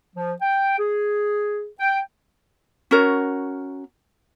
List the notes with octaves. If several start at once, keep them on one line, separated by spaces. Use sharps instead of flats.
F3
G5
G#4
G5
C#4 F#4 A#4 C#5